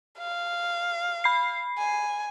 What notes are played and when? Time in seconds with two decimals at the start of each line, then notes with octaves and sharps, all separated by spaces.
0.18 F5
1.24 B5 C7
1.78 G#5